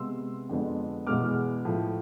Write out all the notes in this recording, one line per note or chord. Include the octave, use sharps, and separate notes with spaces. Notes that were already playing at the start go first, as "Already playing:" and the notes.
Already playing: C3 G#3 B3 C6 E6
F2 D3 G#3 B3
E2 B2 G#3 B3 D6 F6
A2 F3 A3